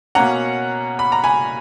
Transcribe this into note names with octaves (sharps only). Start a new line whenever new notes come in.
B2 A#3 C#4 F#5 A#5
B5
A#5
G#5 B5